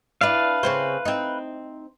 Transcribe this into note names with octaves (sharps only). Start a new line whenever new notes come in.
D4 E4 B4 D5 F5
C#3 C4 C5
C4 D#4